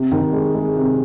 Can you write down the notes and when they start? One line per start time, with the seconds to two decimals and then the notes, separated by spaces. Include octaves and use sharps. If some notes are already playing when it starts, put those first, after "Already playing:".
Already playing: C3
0.12 D#3
0.33 G#3
0.54 G#3
0.76 C3